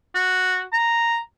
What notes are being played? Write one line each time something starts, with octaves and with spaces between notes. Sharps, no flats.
F#4
A#5